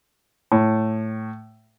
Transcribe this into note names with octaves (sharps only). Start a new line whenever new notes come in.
A2